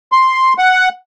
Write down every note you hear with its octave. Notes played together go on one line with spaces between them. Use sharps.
C6
F#5